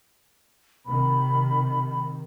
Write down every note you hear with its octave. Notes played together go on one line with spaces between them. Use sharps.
C3 D#3 B5